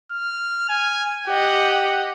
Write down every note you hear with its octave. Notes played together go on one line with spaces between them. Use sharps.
F6
G#5
G4 D#5 F#5